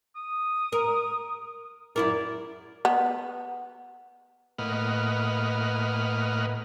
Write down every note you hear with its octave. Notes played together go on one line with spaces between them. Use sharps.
D#6
A#4
F#2 E4 A#4 D5
B3
A2 A#3 B4 D#5 F#5 F6